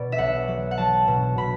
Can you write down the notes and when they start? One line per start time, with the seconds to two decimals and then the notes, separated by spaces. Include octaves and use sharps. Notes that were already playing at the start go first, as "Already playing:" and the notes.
Already playing: B2 B3 D5
0.12 E5
0.18 B1 F#5
0.48 F#3
0.71 F#5
0.78 F#3 A5
1.08 B2
1.37 B2 B5